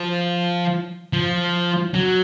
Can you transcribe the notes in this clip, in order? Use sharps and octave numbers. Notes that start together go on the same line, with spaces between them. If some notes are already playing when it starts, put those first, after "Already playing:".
Already playing: F3
F3
F#3